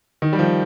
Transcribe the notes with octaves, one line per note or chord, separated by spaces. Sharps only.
D#3
G3
F3